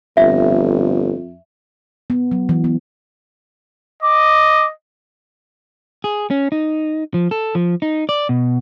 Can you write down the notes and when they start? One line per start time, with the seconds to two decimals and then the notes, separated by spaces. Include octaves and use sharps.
0.17 G1 F2 E5
2.10 B3
2.32 F#3
2.49 E3
2.64 B3
4.02 D#5 D6
6.04 G#4
6.31 C#4
6.52 D#4
7.14 F3
7.31 A4
7.55 F3
7.82 D#4
8.09 D5
8.29 B2